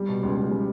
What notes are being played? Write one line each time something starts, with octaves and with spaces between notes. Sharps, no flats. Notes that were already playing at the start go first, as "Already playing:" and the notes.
Already playing: G3
B2
C#2
C#2
G3